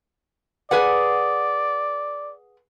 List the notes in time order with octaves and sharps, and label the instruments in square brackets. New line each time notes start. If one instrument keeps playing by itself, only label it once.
[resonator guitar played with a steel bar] G#4 B4 F#5 [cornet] D5